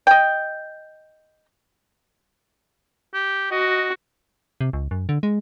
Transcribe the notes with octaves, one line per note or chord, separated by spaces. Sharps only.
D#5 G5
G4
F#4 D#5
C3
C#2
F#2
D3
G#3